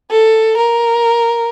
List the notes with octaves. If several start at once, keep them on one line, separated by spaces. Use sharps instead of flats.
A4
A#4